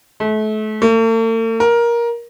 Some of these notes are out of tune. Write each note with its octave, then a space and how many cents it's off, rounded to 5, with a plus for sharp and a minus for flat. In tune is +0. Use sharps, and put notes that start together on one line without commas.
A3 -35
A3 +45
A#4 +15